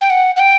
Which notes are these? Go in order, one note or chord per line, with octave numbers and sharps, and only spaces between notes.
G5
F#5
F#5
G5